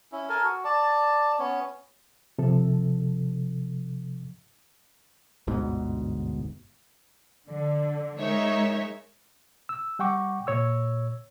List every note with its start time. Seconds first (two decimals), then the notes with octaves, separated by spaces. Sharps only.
0.12 C#4 E4
0.29 A4 A#4 G#5
0.44 F#4
0.64 D5 A5
1.39 B3 C#4 C#5
2.38 C3 F3 A4
5.47 G1 D2 G#2 B2
7.49 D3
8.19 G#3 D#4 A#4 C#5 E5
9.69 E6
9.99 G3 F#5 G5 C#6 D6
10.47 A#2 C#5 E6